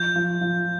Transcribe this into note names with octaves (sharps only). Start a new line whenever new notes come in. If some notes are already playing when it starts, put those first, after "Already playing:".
Already playing: F3 G6
F3
F3